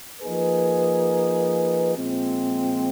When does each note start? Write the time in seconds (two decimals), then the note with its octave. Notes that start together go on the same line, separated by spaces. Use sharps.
0.22 F3 A#3 D#4 G#4 B4
1.96 A#2 F3 G#3 C4